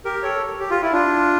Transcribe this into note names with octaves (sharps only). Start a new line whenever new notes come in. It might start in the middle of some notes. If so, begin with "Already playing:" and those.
G4 A#4
A4 C#5
G4
F4
E4
D4 F4